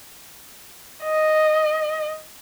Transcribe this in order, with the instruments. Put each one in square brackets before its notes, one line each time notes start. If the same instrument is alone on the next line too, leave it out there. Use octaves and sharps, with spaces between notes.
[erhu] D#5